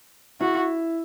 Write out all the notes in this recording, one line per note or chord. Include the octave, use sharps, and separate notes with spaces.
E4 F#4